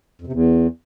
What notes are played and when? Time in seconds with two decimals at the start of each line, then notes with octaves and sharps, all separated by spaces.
0.21 F2
0.27 C3
0.33 E2